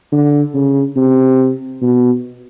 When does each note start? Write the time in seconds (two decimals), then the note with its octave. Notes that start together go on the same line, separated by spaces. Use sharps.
0.12 D3
0.54 C#3
0.96 C3
1.81 B2